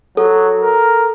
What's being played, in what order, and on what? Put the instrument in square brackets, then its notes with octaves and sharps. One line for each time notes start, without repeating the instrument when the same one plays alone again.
[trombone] F#3 [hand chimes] A4
[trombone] A#4